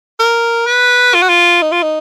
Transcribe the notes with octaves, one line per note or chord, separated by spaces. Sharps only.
A#4
B4
F4
F#4
F4
D#4
F4
D#4